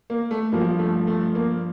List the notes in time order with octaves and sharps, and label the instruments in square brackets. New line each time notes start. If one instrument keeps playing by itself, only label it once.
[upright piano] A#3
A3
G2 F3 A#3
A3
A3
A#3